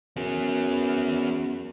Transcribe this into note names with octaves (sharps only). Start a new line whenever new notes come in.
F#2 B3 G#4